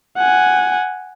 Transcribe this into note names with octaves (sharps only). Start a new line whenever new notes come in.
F#5 G#5